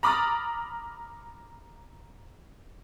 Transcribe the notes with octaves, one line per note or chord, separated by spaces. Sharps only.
A#5 B5 D6 D#6 F6 A6